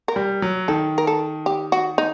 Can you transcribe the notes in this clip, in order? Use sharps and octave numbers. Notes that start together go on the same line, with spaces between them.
A#4
G3
F#3
D#3 A4
A#4
A4
G4
F#4
D#4